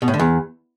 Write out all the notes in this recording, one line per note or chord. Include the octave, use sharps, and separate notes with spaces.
B2
A2
D3
E2